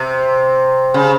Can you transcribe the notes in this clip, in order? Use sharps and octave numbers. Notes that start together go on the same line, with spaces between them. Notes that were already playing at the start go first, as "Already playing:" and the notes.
Already playing: C3
C#3